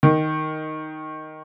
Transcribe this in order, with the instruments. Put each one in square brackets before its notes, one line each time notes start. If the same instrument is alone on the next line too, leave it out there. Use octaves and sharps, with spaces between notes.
[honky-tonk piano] D#3